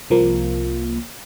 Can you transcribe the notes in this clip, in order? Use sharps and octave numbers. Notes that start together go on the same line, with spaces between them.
C2 F3 A#3